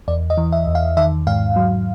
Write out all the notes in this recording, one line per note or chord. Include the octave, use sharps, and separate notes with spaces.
E2 D5
D#5
E3
E5
E2
F5
D#3 E5
G#2 F5
F#3